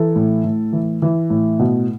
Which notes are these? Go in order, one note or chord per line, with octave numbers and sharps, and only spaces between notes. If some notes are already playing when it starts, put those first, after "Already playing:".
Already playing: E3 A4
A2
A2
E3
E3
A2
B2